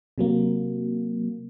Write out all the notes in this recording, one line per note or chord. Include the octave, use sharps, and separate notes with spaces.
C3 F#3 A#3